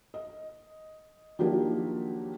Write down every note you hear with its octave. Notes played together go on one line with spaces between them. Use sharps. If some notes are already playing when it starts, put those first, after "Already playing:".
D#5
D#3 F3 F#3 A#3 D4 G4